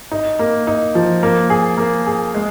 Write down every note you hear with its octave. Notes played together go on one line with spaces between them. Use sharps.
D#4
A#3
D#4
F3
A#3
G#4
A#3
G#4
G#3